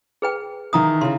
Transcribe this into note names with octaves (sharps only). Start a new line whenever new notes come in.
G#4 B4 G5
D#3 E3 E4 F5 A#5 D#6
C#3 E4 C6